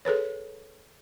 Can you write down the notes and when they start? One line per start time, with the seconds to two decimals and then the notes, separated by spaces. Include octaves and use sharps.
0.05 G#4 A4 B4 C#5